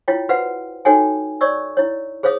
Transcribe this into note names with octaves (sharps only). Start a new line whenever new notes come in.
E4 F4 C#5 G5
F#4 B4 C5 F5 F#5
D#4 F#4 A4 C#5 G5 G#5
C#5 D5 C#6 E6
E4 C#5
G#4 C5 C#5 F5 D#6